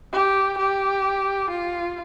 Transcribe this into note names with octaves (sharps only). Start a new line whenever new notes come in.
G4
G4
F4